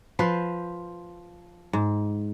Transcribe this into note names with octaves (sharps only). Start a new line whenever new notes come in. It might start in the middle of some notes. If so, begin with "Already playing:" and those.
F3 B4 C5
G#2